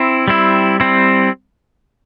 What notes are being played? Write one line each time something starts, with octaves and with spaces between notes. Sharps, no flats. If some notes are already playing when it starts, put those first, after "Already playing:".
Already playing: C4 E4
G3 C4 E4
G3 C4 E4